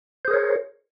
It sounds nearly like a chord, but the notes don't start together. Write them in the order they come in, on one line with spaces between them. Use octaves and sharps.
C5 G#4 A#4 C#5